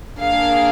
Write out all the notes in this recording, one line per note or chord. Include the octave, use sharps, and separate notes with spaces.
A#3 D4 G#4 F5